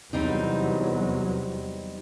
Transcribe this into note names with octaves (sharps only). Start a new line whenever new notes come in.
E2 C3 F#3 G3 C4 D#4